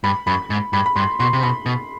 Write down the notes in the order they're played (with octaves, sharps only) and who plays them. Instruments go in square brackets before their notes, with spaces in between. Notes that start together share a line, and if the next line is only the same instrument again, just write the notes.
[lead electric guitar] G2 [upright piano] B5
[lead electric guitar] F#2 [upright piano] B5
[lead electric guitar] G#2
[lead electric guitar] G2 [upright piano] B5
[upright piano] B5
[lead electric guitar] G2 [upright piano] C6
[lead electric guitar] B2 [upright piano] C6
[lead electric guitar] C3
[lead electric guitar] B2 [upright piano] B5
[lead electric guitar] B2